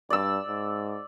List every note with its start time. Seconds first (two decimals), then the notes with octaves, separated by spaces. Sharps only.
0.10 G2 D5 E6
0.48 G#2